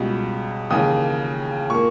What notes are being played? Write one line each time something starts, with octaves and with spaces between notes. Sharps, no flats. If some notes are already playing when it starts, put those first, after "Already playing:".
Already playing: C#2 B2 G3
D#2 C#3 E3 D#6
A#2 A#3 C#6